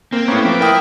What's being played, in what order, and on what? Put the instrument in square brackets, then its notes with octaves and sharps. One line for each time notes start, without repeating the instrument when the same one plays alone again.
[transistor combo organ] A#3 [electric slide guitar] C4
[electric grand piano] A2 A#3 [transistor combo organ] B3 C#4
[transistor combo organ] F3 B4 D6
[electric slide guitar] E4 [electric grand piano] A#4 G5 D#6